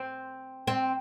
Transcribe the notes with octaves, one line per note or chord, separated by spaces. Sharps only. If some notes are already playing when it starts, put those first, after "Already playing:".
Already playing: C4
C4